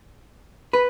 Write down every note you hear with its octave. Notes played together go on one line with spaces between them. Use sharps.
B4